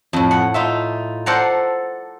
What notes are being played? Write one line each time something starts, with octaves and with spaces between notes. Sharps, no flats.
F2 A2
F#5
D#4 F4 E5
A4 C5 D5 F#5 G5 A#5